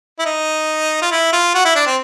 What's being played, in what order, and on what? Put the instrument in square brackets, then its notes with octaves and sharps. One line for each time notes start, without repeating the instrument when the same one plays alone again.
[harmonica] E4
D#4
F4
E4
F4
F#4
E4
D4
C4